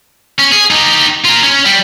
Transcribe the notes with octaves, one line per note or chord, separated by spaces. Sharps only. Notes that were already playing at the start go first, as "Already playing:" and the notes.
C#4
G#4
D#4 G4
F4 A#4
C#4
G3